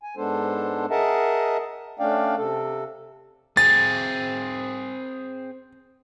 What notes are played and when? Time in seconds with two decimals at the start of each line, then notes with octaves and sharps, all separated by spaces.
0.03 G#5
0.17 G#2 G#3 B3 D4 A4 C5
0.90 G#4 A#4 D#5 E5 F#5 A5
1.99 A3 C#4 D4 D5 F5 G5
2.38 C3 A4
3.57 C4 G#4 A6